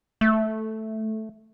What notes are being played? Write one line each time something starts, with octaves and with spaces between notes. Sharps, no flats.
A3